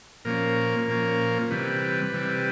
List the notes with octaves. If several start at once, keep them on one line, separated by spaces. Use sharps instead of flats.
A#2 F3 A#3 C#4 A#4
A#2 F3 A#3 C#4
C3 E3 G3 B4
C3 E3 G3